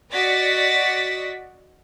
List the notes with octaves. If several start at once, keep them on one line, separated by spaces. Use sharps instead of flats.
F#4 D5 D#5 A6 B6